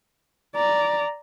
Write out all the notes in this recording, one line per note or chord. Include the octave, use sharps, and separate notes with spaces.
D5 A#5